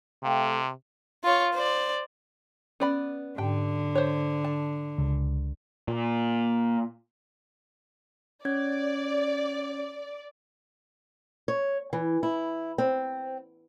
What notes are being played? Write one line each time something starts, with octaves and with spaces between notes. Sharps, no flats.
C3 A3 F5 G5
F4 C#5
C5 D5
B3 C#4 D5 B5
G#2 D3 G5
C5 C#5
A5
C#2
A#2
C#4 C#5 D5 G#6
C#5
E3
E4
C4